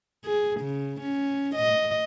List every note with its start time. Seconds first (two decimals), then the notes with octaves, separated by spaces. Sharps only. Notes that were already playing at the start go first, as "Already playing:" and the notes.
0.25 G#4
0.60 C#3
1.01 C#4
1.55 D#5